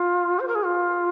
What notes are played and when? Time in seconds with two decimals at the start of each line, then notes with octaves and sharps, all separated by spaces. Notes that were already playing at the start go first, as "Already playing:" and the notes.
Already playing: F4
0.40 C5
0.48 A#4
0.55 G#4
0.63 F4